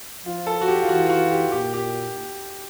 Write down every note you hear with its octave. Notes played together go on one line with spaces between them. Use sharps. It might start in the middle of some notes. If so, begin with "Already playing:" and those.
F3 F4
A4
F#4
G4
F4
E3 F#4
F4
F#4
G4
A#2 G4
G4